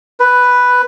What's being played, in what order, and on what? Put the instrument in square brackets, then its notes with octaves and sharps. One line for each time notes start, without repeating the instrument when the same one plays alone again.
[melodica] B4